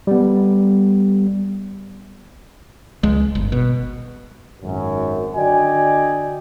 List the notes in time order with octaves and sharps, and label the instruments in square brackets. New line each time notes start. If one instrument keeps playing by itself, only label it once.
[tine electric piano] G3 B3
[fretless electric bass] C#2 G#3
G1
B2
[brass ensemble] G#1 F#2
D3 F#4 D5 D#5 G5 G#5